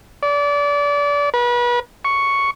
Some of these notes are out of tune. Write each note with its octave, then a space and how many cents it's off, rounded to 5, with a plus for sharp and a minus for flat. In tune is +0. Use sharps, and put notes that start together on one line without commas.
D5 -30
B4 -35
C#6 +5